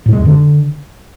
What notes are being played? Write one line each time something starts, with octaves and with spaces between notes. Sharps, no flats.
A2
G#3
F2
D3